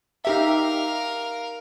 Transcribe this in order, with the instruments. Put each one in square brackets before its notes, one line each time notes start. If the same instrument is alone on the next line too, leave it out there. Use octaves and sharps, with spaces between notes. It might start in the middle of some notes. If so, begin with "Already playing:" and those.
[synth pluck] D#4 G4 E5 [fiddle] A#4 F5